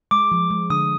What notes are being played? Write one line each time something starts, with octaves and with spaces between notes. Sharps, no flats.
G#3 D6
F3
G#3
D3 D#6